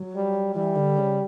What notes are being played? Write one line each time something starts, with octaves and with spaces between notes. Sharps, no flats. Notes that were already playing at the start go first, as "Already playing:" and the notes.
Already playing: F#3
G3
E3 G3
D3
C#3